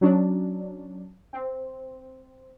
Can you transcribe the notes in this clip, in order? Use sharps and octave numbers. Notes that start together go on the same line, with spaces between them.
F#3 C#4 D4
C4